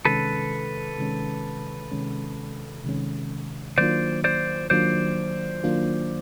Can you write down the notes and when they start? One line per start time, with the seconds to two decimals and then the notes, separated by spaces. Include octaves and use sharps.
0.05 C3 D#3 G#3 C#4 A4 B4
0.98 C3 D#3 G#3 C#4
1.91 C3 D#3 G#3 C#4
2.84 C3 D#3 G#3 C#4
3.78 D#3 F#3 A#3 D4 F4 C5 D5
4.24 C5 D5
4.70 D#3 F#3 A#3 D4 F4 C5 D5
5.64 D#3 F#3 A#3 D4 F4